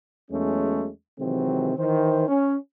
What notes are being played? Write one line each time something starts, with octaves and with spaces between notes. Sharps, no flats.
E2 F#3 G#3 A3 C#4
C3 D#3 E3 F#3 G#3 C4
D#3 E3 C5
C#4